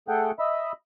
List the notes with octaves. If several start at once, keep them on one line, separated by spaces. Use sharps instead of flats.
A3 G#4 A4 F#5 G5
D#5 E5 B5